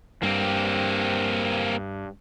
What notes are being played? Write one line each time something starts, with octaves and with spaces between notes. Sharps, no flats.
G2 A#3 C4